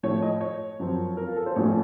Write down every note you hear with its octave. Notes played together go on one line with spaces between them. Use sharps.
A2 F3 A3 C#5
D#5
C#5
F#2 F3 C4
A#4
F4
A4
C5
A1 A2 F3 A3 C#4 C#5